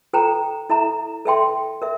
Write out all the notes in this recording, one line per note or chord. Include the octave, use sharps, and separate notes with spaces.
F4 A4 C5 G5 A#5
E4 A4 E5 A#5
A4 E5 G5 C6
A#4 E5